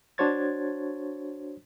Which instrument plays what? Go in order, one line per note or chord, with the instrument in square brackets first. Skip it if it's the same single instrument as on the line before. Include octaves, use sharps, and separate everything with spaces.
[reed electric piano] D4 F#4 C5 C#5 G#6 A6